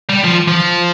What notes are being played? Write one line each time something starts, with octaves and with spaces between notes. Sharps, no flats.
G3
F3
F3